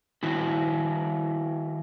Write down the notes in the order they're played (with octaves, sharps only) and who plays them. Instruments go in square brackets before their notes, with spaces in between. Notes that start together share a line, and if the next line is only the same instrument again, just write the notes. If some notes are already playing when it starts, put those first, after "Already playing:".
[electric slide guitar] D#3 E4 F#4